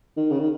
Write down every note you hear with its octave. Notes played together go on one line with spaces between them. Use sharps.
D#3
C#3
D#3